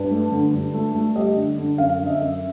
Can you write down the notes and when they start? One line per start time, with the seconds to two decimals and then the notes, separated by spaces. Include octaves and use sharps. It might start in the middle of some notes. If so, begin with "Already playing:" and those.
Already playing: G2 B4
0.11 A3
0.32 D3
0.53 G2
0.74 A3
0.94 A3
1.15 G3 D#5
1.37 D3
1.58 D3
1.78 F#2 F5
2.00 D3
2.06 D#5
2.10 E5
2.20 F#2